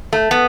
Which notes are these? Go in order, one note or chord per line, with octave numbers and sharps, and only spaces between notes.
A3
B3